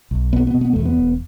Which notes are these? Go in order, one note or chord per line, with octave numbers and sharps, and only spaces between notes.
B1
B2 B3
B3
B2
B3
E2 A3
B3
E1